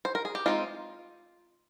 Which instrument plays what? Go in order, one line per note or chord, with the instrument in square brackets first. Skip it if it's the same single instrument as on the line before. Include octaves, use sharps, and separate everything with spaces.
[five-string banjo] C5
A#4
G#4
G4
G#3 C4 D#4 F4